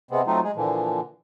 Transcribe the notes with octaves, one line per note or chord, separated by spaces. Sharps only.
C3 G#3 B3 C4
F#3 A3 C4 D#4 F4
G#3 G#4
A#2 D3 E3 F3